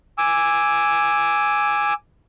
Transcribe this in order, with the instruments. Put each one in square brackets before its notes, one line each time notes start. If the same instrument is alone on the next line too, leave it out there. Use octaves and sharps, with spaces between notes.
[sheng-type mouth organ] G#5 D6 E6